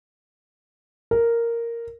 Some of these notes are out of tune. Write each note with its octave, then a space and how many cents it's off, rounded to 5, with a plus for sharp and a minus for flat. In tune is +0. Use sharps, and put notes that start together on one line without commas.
A#4 -5